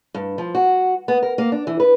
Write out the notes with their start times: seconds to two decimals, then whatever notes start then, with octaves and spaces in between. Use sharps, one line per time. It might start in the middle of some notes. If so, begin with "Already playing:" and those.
0.14 G2
0.38 F3
0.55 F#4
1.08 B3
1.23 A#4
1.38 A#3
1.52 D4
1.67 E3
1.80 B4